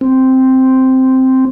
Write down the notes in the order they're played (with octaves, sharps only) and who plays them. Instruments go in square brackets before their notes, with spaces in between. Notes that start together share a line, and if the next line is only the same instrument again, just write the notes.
[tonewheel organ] C4